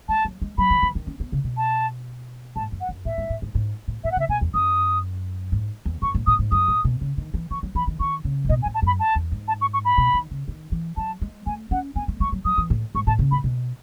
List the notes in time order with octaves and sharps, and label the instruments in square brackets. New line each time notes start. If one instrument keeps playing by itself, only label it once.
[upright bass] G#3 [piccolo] A5
[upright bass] F#3
G#3
[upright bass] F#3 [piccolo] B5
[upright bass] E3
E3
D#3
C#4
B3
C#3
B2
[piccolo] A5
[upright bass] G#2 [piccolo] A5
[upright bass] F#2
[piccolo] F#5
[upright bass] F#2
[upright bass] A2 [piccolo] E5
[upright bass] G#2
A2
G#2
G#2
A2
[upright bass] A2 [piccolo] E5
[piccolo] F#5
[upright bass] C#3 [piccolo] E5
[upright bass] B2 [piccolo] G#5
[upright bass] E2
[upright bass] F#2 [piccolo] D#6
[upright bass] G#2
E2
[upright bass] F#2 [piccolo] C#6
[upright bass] A2
[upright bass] A2 [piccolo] D#6
[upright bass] G#2
[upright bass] F#2 [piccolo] D#6
[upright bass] A2
B2
C#3
D#3
E3
[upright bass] E3 [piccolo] C#6
[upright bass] F#3
[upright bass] E3 [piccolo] B5
[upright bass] D#3
[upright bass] D#3 [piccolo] C#6
[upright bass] C#3
A2
[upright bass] B2 [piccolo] D#5
[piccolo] G#5
[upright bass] A2
[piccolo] A5
[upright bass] F#2 [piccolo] B5
[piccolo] A5
[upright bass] E2
G#2
[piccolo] A5
C#6
C#6
B5
[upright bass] B2
D#3
C#3
D#3
E3
[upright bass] F#3 [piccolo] A5
[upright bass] G#3
[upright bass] A3 [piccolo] G#5
[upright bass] C#4 [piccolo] F#5
[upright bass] B3 [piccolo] G#5
[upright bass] A3
[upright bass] G#3 [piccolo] C#6
[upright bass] F#3
[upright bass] F#3 [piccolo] D#6
[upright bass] E3
A2
[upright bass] G#2 [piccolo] C#6
[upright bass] A2 [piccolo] A5
[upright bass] C#3
[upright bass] A2 [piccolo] B5
[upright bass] B2